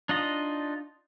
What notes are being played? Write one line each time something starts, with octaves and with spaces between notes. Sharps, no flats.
D4 D#4 F4 D#5